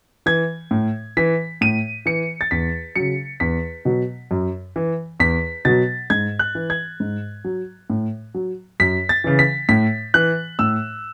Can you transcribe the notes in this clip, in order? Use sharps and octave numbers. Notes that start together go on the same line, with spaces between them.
E3 G#6
A2
E3 B6
A2 D#7
E3 C#7
A6
E2 B6
C#3 F#3 C#7
E2 B6
B2 F#3
F#2
E3
E2 B6
B2 F#3 A6
G#2 G#6
F#6
E3
G#6
G#2
F#3
A2
F#3
F#2 B6
A6
C#3 E3
B6
A2 B6
E3 F#6
A2 E6